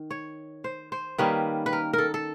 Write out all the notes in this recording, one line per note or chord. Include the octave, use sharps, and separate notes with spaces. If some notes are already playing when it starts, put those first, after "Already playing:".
Already playing: D#3
C#5
C5
C5
D#3 G3 A#3 C#4 B4
B4
A#4
A4 A#4
A4